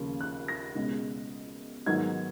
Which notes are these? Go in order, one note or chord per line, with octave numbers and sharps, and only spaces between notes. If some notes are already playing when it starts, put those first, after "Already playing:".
Already playing: D#2 C#3 F3 A#3
F#6
A#6
C#2 B2 G#3 C#4
G#2 D#3 F#3 B3 G#6